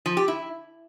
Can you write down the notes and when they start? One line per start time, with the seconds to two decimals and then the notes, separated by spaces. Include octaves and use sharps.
0.06 F3
0.17 G4
0.28 E4